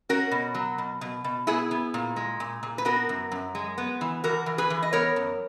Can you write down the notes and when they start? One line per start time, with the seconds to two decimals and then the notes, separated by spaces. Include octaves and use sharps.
0.09 C#4 F#4 A#4
0.31 B2
0.54 F#3
0.78 B2
1.01 B2
1.24 B2
1.47 B3 E4 G#4
1.71 B3
1.94 A#2
2.16 G#3
2.40 A#2
2.63 A#2
2.78 B4
2.85 B3 F#4 A#4
3.09 F#2
3.31 F#2
3.55 G#3
3.78 B3
4.01 E3
4.24 E3 F#4 A#4
4.46 E3
4.58 G#4 B4
4.70 E3
4.83 D#5
4.93 B3 A#4 C#5
5.16 F#2